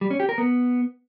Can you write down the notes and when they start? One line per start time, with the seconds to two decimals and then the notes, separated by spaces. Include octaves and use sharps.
0.01 G3
0.10 C#4
0.20 G4
0.29 A#4
0.38 B3